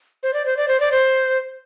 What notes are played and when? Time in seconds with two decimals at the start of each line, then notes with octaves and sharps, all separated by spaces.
0.23 C5
0.34 D5
0.46 C5
0.57 D5
0.68 C5
0.80 D5
0.92 C5